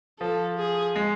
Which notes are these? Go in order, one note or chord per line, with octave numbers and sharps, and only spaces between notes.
F3 A4
G#4
G#3